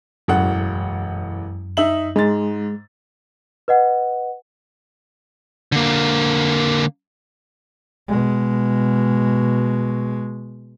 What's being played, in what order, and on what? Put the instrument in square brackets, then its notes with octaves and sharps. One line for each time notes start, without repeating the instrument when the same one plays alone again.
[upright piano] E1 A1 F#5 [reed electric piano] F#2
[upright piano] D#4 E5 F#7
[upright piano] G#2 A6 [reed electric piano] G#3
[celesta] B4 D#5 F#5
[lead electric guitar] D3 A#3
[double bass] B2 G#3